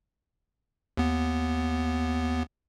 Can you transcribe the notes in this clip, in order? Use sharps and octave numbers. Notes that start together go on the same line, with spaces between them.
D#2 B3